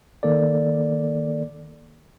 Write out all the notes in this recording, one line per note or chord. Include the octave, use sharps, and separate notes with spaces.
D#3 A#3 A4 D5